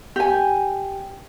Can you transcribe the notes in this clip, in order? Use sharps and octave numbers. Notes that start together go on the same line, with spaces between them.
G4 G#5